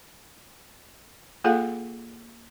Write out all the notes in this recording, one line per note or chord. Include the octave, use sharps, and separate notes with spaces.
A#3 F4 G#4 A4 F5 F#5